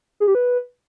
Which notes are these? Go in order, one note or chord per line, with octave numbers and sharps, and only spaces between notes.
G#4
G4
B4